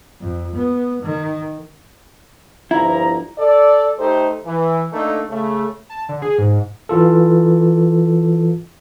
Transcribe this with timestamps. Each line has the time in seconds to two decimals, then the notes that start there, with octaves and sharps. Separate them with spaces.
0.21 F2
0.56 B3
1.03 D#3
2.71 G1 F3 E4 A#5
3.39 A4 D5
3.99 A3 D#4 G4 A4 C5
4.46 E3
4.92 A3 A#3 D4 D#4 A4
5.30 C#3 A3
5.90 A5
6.09 D3
6.22 G#4
6.38 G#2
6.89 E3 F4 A4